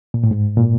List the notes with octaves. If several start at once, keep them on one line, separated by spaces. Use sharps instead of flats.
A#2
A2
G#2
A#2